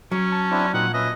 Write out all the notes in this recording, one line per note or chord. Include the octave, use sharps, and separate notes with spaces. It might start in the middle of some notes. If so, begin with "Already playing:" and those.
F#3 C#4
A5
C4 D4 E4
A#2 C4 D#4 F#4 F#5
C#4 B4 D#5 E5